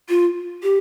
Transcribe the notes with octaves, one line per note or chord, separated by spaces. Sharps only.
F4
G4